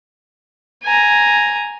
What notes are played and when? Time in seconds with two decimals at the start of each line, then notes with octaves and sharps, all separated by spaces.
0.84 G#5 A#5